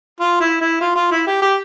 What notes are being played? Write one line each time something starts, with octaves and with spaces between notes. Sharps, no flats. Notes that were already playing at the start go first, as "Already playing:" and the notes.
F4
E4
E4
F4
F4
E4
G4
G4